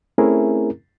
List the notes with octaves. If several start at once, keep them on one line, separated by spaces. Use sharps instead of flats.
A3 C4 C#4 E4 G#4 A#4